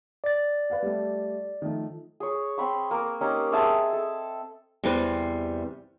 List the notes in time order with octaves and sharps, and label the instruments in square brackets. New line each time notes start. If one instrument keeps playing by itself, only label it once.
[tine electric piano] D5 A6
[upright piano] B4 F5 F#5
G3 A3
D#3 F3 A3
[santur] G#4 C#5
C4 B5 C#6
A#3 A#4
A#3 C#4 D#4 G4
C4 G#4 E5 A5
A4
[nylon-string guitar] E2 C3 G3 C4 B4